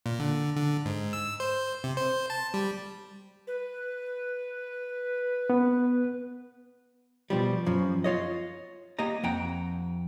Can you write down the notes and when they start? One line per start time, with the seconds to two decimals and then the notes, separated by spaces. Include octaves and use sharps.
0.06 A#2
0.20 D3
0.56 D3
0.85 G#2
1.13 E6
1.40 C5
1.84 C3
1.97 C5
2.30 A5
2.54 G3
3.47 B4
5.50 B3
7.30 B2 F3 G3
7.66 F#2 F3
8.04 F4 C#5 D#5
8.99 A#3 G4 D#5 A#5
9.23 F2 F#5 G5 A#5